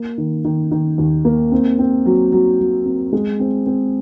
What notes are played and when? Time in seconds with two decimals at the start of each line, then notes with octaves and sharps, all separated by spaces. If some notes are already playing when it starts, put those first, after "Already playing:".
Already playing: A#3
0.18 D#3
0.45 D#3
0.71 D#3
0.98 D#2
1.25 A#3
1.52 C4
1.79 C4
2.05 F#3
2.32 F#3
2.59 F#3
2.86 C4
3.13 G#3
3.40 C4
3.66 C4